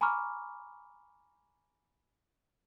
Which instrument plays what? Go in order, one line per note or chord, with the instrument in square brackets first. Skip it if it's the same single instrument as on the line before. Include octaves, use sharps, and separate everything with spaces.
[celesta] G#5 A#5 B5 C#6 D6 F6